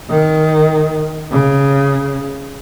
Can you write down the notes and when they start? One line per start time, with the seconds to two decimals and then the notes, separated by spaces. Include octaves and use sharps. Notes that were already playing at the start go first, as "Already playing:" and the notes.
0.09 D#3
1.31 C#3